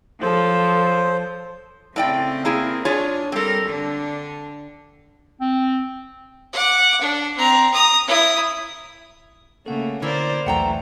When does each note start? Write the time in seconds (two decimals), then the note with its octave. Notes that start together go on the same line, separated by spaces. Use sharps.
0.22 F3 A4 C5 C#5 C6
1.96 A2 C#3 C4 D5 G5
2.45 A#3 E4 G#4
2.85 D4 F4 G#4 C#5
3.32 G3 C4 A4 A#4
3.66 D3 D4
5.41 C4
6.53 F#5 D6
7.01 D4
7.37 C4 A#5
7.73 A#5 D#6
8.07 E4 D#6
9.66 C#3 A3 A#3 A4 F#5
10.02 D3 A#3 E4 A#4 C5 D5
10.46 B1 E2 E3 A3 F#5 G5 A#5